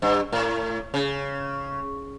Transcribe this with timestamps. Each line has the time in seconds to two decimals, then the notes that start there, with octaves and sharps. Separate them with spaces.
0.02 G2
0.32 A2
0.94 C#3